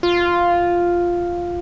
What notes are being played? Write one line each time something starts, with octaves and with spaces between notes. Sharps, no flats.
F4